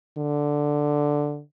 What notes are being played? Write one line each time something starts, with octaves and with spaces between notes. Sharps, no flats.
D3